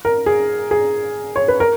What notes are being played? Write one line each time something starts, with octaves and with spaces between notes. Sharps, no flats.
A#4
G#4
G#4
C#5
B4
A#4